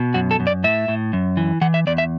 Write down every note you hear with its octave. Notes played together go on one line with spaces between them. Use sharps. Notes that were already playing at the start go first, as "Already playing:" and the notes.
Already playing: B2
F#2 F#4
A4
F#2
D5
A2 E5
A2
F#2
E3
E3 F#5
E5
E2 D5
E5